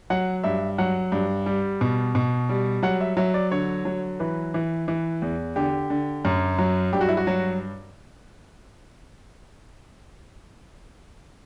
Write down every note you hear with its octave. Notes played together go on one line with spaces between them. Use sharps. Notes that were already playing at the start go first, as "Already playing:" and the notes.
F#3 F#5
G2 E5
F#3 F#5
G2
G3
B2
B2
G3
F#3 F#5
E5
F#3 E5
D5
D3 C#5
F#3
E3 B4
E3
E3
E2
D3 G4
D3
F#2
F#3
G2 G4
F#4
E4
F#4
F#3